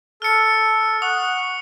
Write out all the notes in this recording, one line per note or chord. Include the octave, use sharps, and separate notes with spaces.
A4 F6 C#7
F#5 C#6 D#6 F#6